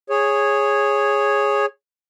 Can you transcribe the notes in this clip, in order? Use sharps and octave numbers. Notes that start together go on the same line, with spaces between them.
G#4 C#5